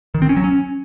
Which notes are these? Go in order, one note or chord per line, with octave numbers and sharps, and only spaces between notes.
D#3
C4
C#4
F#3
C#4